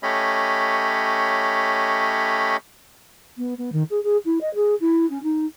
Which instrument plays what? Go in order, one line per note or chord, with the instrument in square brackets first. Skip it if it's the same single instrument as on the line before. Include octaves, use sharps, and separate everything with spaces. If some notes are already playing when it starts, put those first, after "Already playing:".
[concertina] A3 C#4 G4 C#5 D#5 B5
[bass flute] B3
B3
D#3
G#4
G#4
E4
D#5
G#4
E4
C#4
D#4